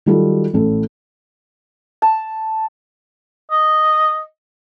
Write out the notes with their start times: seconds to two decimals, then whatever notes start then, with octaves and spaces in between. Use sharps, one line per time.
0.06 D#3 F#3 G3 F4 A4
0.53 A1 A2 A4
2.02 A5
3.51 D#5